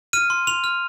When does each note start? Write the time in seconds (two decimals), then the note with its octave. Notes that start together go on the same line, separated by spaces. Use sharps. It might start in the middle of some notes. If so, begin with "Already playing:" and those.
0.13 F6 D#7
0.30 C6
0.47 C6 F7
0.64 F6